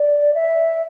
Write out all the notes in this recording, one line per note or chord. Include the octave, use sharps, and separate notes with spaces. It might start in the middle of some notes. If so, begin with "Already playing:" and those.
Already playing: D5
E5